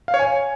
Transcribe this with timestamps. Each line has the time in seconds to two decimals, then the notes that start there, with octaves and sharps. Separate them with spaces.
0.08 F5
0.14 C#5
0.19 G#5